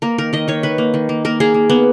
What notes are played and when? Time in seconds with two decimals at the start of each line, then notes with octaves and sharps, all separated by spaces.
0.02 A#3 A#4
0.18 D#3 A#4
0.33 D#3 D#5
0.48 D#3 C#5
0.63 D#3 B4
0.78 A#3
0.94 D#3
1.09 A#3
1.25 A#3 A#4
1.40 A#3 G#4
1.54 A#3
1.70 A#3 B3